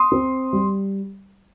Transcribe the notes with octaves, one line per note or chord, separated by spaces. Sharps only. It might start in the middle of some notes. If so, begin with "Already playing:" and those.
Already playing: C6 D#6
C4
G3